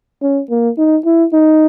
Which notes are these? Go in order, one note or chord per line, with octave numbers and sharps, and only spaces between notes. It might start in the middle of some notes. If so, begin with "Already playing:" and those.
C#4
A#3
D#4
E4
D#4